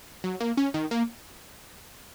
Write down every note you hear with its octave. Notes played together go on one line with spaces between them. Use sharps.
F#3
A#3
C#4
D#3
A#3